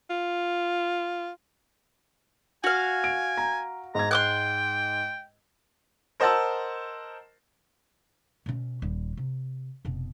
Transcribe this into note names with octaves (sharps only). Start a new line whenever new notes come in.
F4
F#4 F5 G#5
D7
A#5
G#2 A#5 G#6
G5 C6 D6 F#6
A#4 C5 D#5 F#5 A5 E6
B2 C#4
D#1 G3
C3
F1 B2